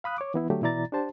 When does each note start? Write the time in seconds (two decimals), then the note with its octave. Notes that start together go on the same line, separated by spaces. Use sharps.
0.04 F5 B5 D#6 F#6
0.18 C#5 D6
0.34 E3 B3 E4
0.50 D3 F#3 A3 G4
0.62 B2 E3 E4 D5 A#5 A6
0.92 D4 G4 C5 A5